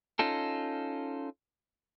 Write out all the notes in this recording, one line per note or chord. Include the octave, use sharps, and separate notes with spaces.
C#4 D#4 F4 A4